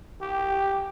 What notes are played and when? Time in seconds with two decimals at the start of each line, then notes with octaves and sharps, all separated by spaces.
0.21 G4